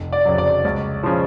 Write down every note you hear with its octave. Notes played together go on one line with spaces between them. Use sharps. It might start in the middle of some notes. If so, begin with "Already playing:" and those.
Already playing: F1
D5
F2 C#3 F#3
D5
C#2
C#3 F3